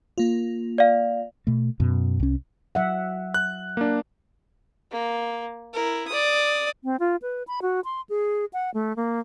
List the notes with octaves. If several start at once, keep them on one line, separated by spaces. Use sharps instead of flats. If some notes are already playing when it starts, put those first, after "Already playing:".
A#3 F4
D5 F5
B2 A3
F#2 B2
C2 C#4
F#3 E5 F#5
F#6
A#3 D4
A#3
E4 A#4
D5 D#6
C4
F4
B4
B5
F#4
C6
G#4
F#5
A3
A#3